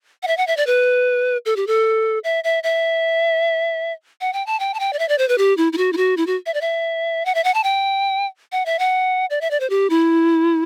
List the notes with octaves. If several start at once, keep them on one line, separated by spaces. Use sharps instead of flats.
F#5
E5
F#5
E5
D5
B4
A4
G4
A4
E5
E5
E5
F#5
G5
A5
G5
A5
G5
D5
E5
D5
C5
B4
G4
E4
E4
F#4
E4
F#4
E4
F#4
E5
D5
E5
F#5
E5
F#5
A5
G5
F#5
E5
F#5
D5
E5
D5
C5
G4
E4